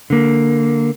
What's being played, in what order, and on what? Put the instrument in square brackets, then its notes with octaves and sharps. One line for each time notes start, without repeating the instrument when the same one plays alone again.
[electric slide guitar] D3 A#3